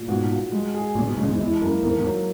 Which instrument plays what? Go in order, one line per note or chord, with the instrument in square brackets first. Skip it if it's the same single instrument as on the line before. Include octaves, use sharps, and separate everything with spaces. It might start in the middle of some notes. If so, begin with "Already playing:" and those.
Already playing: [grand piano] A#2
[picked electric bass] G#2 B2 [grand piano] F#4
[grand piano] F#4
G#3
G#4
[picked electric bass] A#2 C#3 [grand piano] G#3
[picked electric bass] G#2 B2
[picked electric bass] A#2 C#3 [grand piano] G#3
[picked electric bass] E2 G#2
[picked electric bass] E2 [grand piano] E4
[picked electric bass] F#2 [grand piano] A#3
[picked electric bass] E2 G#2 [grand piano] A#4
[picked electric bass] E2 G#2
[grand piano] F#3